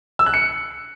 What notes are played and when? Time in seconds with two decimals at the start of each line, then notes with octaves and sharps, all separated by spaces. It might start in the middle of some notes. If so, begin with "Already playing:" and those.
0.19 E6
0.26 F#6
0.34 C#7